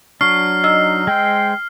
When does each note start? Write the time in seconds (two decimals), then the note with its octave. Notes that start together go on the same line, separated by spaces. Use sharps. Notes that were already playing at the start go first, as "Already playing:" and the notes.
0.21 F#3 D4 C#6 F6 C7
0.64 D#4 D#5 E6
1.07 G#3 C5 G5